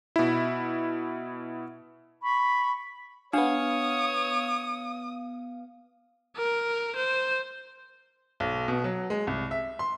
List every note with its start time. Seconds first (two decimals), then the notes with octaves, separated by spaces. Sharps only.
0.16 B2 E4
2.22 B5 C#6
3.33 B3 D4 C#5 F5 D#6
6.37 A#4
6.96 C5
8.40 B1
8.68 B2
8.84 F#3
9.10 G#3
9.27 C2
9.51 E5
9.79 C6